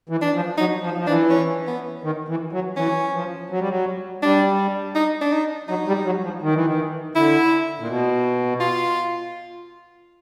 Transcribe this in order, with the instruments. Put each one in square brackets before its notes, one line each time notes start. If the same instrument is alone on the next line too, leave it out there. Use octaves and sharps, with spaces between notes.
[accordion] E3
[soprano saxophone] D4
[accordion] F3
[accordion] F#3 [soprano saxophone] D#4
[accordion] F3
F3
[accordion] E3 [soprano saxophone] D4
[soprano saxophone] C#4
B3
[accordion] D#3
E3
F#3
[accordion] E3 [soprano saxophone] C#4
[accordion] F3
F#3
G3
F#3
[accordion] G3 [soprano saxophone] D4
[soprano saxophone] D#4
D4
D#4
[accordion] F#3 [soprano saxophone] D#4
[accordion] G3
F#3
F3
D#3
E3
D#3
[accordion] D3 [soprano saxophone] E4
[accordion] A#2
B2
[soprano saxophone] F4